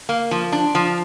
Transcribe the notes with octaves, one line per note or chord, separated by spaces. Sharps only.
A#3
F3
D4
F3